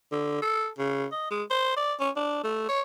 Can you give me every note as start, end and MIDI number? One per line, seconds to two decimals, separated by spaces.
0.11 0.41 50
0.42 0.68 69
0.78 1.05 49
1.12 1.28 75
1.30 1.43 56
1.50 1.73 72
1.76 1.94 74
2.00 2.10 61
2.16 2.43 62
2.43 2.65 57
2.69 2.81 73